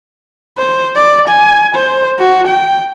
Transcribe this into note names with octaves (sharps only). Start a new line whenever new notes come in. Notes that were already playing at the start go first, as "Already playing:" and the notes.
C5
D5
G#5
C5
F#4
G5